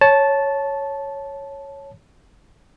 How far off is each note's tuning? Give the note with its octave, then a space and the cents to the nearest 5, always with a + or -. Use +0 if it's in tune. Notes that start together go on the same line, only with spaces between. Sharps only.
C#5 +0 A5 -10